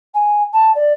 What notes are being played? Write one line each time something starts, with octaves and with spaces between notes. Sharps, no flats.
G#5
A5
D5